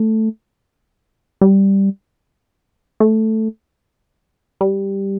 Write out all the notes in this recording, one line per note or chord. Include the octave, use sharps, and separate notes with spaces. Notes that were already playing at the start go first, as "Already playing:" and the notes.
Already playing: A3
G3
A3
G3